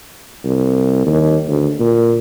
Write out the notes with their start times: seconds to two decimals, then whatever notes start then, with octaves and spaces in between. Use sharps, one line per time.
0.45 C2
1.07 D#2
1.49 D2
1.80 A#2